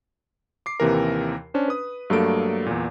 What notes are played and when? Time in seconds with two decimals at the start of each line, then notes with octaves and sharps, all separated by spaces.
0.66 D6 C7
0.80 D#2 C3 E3 A#4
1.54 C#4 D4 C5
1.68 B4 D#6
2.10 G2 F#3 A3 A#3 A4 D7
2.66 E2 A#2